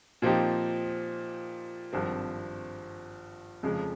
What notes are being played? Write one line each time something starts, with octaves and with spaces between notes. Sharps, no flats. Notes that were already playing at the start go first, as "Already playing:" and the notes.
A#2 F3 C4 D#4 G4
G#1 G2 F3 C4
F1 F2 C#3 F3 G#3